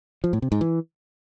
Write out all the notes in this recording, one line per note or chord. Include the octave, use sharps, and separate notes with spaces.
F3
A2
C3
G#2
E3